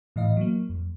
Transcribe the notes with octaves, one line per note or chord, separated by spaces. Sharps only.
A2 E3 D#5 F5
F#3 A#3
F2